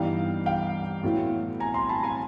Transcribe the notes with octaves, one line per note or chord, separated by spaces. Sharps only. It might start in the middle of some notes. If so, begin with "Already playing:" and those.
Already playing: G2 E3 G3 B3 D#4 F5 G5
F5 G5
A2 F#3 B3 E4
G#5 A#5
A#5 C6
A5 B5
G#5 A#5